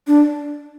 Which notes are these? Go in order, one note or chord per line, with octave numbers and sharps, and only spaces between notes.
D4